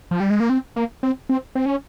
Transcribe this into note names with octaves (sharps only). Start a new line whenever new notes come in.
F3
G3
G#3
A#3
C4
A#3
C4
C4
C4
C#4